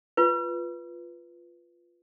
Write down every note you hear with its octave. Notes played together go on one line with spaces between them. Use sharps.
F4 B4